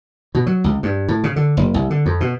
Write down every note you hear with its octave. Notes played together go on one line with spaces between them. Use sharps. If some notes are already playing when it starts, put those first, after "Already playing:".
B2
F#3
C#2
G2
A2
C#3
D3
F#1
C2
D3
F2
B2